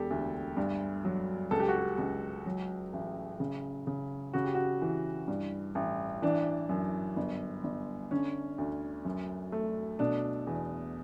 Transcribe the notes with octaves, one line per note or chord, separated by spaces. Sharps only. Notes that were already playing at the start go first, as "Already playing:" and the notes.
Already playing: E1 G4 A4
D2
G2
F#3
C#2 A4
G4
F#4
G4
C#2
F#3
A1
C#3
C#3
C#3 F#4
G4
F#4
E3
G2
A1
E3 D4
F#2
G1
G1
D3 C#4
D2
F#2
A3
B2 D4
E2